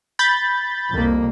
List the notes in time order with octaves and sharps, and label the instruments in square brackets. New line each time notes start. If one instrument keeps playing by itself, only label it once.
[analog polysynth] B5 G6 A6
[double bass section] C2 F2 A#3